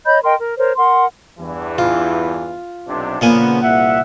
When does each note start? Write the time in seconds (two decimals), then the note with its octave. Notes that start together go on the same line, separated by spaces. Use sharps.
0.06 C#5 D#5 B5 G6
0.23 A#4 D#5 G5 C6
0.40 A#4
0.58 A#4 C5 C#5
0.77 A#4 F#5 C6
1.39 E2 G2 E3
1.78 F4
2.88 B1 C3 D4
3.21 A#2 C#3 F3 A#3 B3 G#5
3.62 C2 E5 F#5